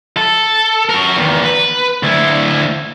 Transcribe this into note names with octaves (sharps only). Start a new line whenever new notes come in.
A4
F#4 A#4
E2 D#3
B4
D2 E4